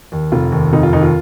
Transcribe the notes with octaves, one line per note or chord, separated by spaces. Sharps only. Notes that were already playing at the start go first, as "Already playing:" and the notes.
D#2
F1 F4
D#2
F1 D#4
F4
D#2 D#4
F4